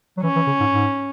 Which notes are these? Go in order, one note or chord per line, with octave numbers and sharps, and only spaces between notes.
F#3
E3 C#4
E3
C#3
G#2
G#2